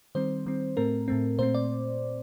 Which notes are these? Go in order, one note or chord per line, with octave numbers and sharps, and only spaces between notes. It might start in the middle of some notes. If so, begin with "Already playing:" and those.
D#3 G3 C4 C5
D#3 G3 C4
A2 A3 C4 A#4
A2 A3 C4
A#2 A3 C4 C5
D5